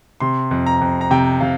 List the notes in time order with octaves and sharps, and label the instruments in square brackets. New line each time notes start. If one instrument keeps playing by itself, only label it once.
[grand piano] C3 C6
F2
A#5
F2
A#5
C3 G5
C3 F5